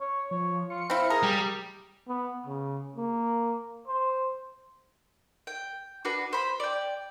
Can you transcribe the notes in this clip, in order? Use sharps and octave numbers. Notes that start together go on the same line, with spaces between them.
C#5
F3 C#5
F4 C#7
C4 E4 F5
G#4 A#4
G3 A#5
B3
C#3
A#3
C5
G5
D4 F#4 B4
C5 B5
D5 G5